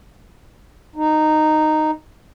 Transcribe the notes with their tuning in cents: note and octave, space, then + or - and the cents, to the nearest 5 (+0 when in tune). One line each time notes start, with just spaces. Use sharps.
D#4 -10